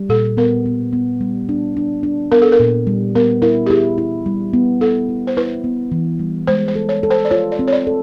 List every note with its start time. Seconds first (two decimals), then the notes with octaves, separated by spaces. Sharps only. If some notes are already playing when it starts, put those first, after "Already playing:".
Already playing: G3
0.09 A#2 A4
0.37 B3 A#4
0.66 B3
0.93 B3
1.21 G3
1.49 D4
1.77 D4
2.03 D4
2.32 B3 A#4
2.42 A4
2.52 A#4
2.60 A#2
2.87 G3
3.15 B3 A#4
3.42 E4 A#4
3.66 G4
3.70 E4 G#4
3.98 E4
4.26 G3
4.53 B3
4.81 E4 A4
5.09 E4
5.27 C5
5.37 E4 B4
5.64 B3
5.92 E3
6.19 G3
6.47 G#3 C5
6.68 C5
6.76 A4
6.89 C#5
7.03 A4
7.10 C5
7.25 D5
7.31 F4 C#5
7.52 D5
7.59 C4
7.68 C#5
7.72 D5
7.87 A4